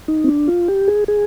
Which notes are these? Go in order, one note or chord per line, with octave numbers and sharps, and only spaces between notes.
D#4
C4
D4
F4
G4
G#4
G#4